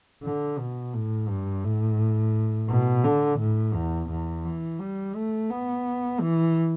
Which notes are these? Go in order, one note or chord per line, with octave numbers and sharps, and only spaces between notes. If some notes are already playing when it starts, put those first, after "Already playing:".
D3
B2
A2
G2
A2
B2
D3
A2
E2
E2
E3
G3
A3
B3
E3